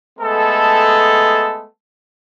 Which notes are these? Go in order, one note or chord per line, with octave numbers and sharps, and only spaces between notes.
G#3 A3 B3 A4